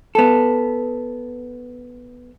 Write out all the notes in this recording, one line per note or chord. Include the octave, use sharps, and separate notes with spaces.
B3 A4